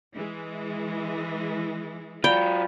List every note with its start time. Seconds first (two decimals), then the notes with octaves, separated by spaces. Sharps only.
0.14 E3 G#3
2.24 F#3 F4 D5 G5 B5